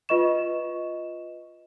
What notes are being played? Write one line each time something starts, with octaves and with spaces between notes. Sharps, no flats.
F4 B4 D#5 C#6 E7